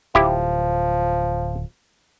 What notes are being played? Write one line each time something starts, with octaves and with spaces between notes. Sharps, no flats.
D1 F3 E4 G4